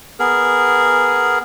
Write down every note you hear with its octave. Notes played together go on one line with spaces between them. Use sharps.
B3 G#4 A#4